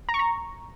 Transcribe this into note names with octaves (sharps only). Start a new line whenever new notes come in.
A#5
C#6
A#5